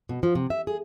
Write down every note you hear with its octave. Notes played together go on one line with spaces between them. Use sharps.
B2
F3
C3
E5
G#4